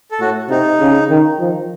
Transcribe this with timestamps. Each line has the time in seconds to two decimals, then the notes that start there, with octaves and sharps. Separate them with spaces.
0.11 A4
0.20 A2 F#4
0.50 C3 D#4
0.80 C#3
1.10 D#3
1.40 F3